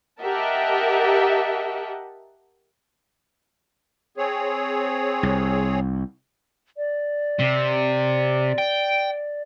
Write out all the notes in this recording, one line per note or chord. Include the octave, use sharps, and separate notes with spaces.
G4 A#4 D#5 E5 F#5 A5
C4 G#4 C#5
C2
D5
C3
G5